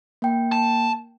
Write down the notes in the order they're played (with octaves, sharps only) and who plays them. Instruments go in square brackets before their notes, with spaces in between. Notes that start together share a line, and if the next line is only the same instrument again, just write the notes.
[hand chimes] A#3 G5
[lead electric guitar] A5